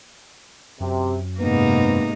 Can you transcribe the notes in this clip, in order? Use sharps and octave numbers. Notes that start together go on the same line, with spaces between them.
F#2 C3
G#2 C3 A#3 B3 D#4